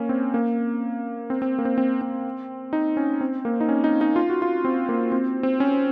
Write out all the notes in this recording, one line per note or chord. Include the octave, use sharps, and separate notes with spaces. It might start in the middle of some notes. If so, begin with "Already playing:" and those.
Already playing: A#3 C#4
C4
A#3
C4
C4
A#3
C4
C4
C4
D#4
C#4
C4
A#3
D#4
C#4
D#4
D#4
F4
F#4
F4
C4
A#3
C4
C4
C#4